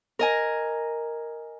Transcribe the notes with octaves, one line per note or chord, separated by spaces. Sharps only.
A#4 D#5 G#5